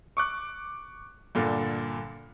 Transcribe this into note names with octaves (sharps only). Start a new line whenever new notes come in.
C#6 D6 F#6
G2 A#2 D3